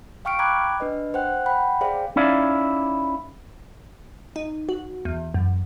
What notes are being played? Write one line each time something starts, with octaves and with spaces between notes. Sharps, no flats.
F5 G5 C#6 F6 C#7 D7
G5 A#5 B5 D6 F#6 G#6
D4 B4 D#5
C5 F#5 G5 F#6
F#5 G5 B5
G#4 C5 D5 F5 G5
C#4 D#4 E4 D5 F5
D#4
F#4
E2
F#2